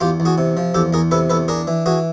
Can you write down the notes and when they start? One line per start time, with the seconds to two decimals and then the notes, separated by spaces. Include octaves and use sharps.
0.01 E2 F4 G4
0.20 E2
0.25 F#4 G#4
0.38 C3
0.57 F3
0.74 E2 G4 A4
0.93 E2 G#4 A#4
1.11 C3 A4 B4
1.30 E2 A4 B4
1.48 D4 G#4 A#4
1.67 E3
1.86 E3 F#4 G#4